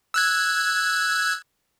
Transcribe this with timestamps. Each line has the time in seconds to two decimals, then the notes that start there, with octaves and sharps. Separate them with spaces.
0.14 E6 F#6 G#6